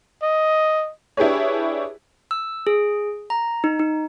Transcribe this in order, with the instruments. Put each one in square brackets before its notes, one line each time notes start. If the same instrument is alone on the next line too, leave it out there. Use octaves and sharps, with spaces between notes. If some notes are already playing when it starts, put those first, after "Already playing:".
[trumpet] D#5
[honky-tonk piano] D4 E4 G4 G#4 B4 C#5
[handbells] E6
G#4
A#5
D#4
D#4